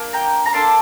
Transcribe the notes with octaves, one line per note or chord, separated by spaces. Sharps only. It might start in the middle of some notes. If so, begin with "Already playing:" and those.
Already playing: A#3 D4
G5 A#5
A#5
A#3 D4 A4 A5 C6